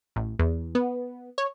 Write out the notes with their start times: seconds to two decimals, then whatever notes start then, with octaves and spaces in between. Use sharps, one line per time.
0.16 A1
0.39 E2
0.75 B3
1.38 C#5